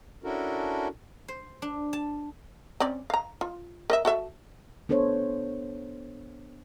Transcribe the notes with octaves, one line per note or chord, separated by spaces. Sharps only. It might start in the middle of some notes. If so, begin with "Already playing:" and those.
C#4 D4 E4 F#4 A4 A#4
C5
D4
A5
C4 C#4 D5
F5 A#5
F4
A#4 D#5 E5
F#4 A4 E5
B3 D4 A4 C5 C#5